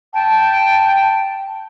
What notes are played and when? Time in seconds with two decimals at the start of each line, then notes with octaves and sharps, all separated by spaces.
0.14 G5 A5